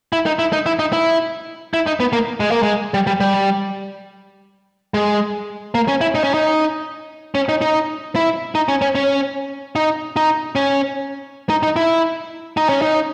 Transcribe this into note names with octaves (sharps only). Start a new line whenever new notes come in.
E4
D#4
E4
D#4
E4
D#4
E4
E4
D#4
B3
A#3
G#3
A#3
G#3
G3
G3
G3
G#3
A#3
C#4
E4
D#4
C#4
D#4
C#4
D#4
D#4
E4
D#4
C#4
C#4
C#4
D#4
D#4
C#4
D#4
D#4
E4
D#4
C#4
D#4